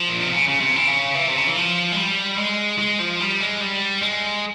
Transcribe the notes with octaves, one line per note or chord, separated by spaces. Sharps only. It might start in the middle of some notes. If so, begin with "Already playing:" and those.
Already playing: F3
A#2
C3
C#3
C#3
C3
E3
C#3
E3
C3
C#3
E3
F3
G#3
G3
G#3
G#3
F3
G3
G#3
G3
G#3